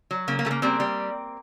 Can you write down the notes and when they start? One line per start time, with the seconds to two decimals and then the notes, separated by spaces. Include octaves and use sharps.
0.11 F#3
0.28 C#3 A#3
0.39 A#3
0.45 C#3 A3
0.51 A#3
0.62 G3 A#3 C4
0.80 G3